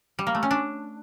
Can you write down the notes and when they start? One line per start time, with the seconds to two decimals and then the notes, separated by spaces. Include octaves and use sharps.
0.19 G3
0.27 A#3
0.35 A3
0.43 C#4
0.51 D4